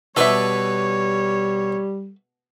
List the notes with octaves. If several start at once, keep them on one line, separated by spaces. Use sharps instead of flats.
B2 G3 A4 B4 C#5 D5 E5 C#6